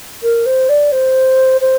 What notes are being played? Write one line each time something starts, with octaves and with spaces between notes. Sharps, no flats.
A#4
C5
D5
C5
C5